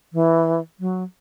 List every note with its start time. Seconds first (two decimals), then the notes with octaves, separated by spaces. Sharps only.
0.13 E3
0.79 F#3